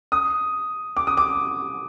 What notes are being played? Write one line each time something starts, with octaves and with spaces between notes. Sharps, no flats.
D#6
D6
D#6
D6